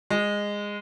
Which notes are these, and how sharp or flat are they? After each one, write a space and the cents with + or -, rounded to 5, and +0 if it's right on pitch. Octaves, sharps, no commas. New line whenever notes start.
G#3 -15